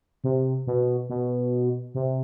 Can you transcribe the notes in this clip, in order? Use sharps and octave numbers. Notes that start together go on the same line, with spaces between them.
C3
B2
B2
C3